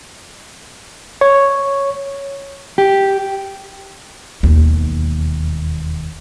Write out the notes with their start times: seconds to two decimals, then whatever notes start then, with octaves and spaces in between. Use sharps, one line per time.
1.21 C#5
2.78 G4
4.43 E1 D#2